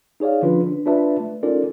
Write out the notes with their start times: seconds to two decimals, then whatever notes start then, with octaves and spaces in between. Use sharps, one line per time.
0.20 D#4 G#4 C#5 D5 F5
0.42 D3 F3 C#4 D4 F4 B4
0.67 D4
0.86 D4 F4 B4 D5 E5 A5
1.20 A3
1.43 C#4 D#4 F4 A4 A#4 D5